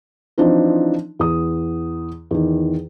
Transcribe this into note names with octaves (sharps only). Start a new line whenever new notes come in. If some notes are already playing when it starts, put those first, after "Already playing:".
E3 F3 C4 D4 D#4
E2 D#6
E2 D#3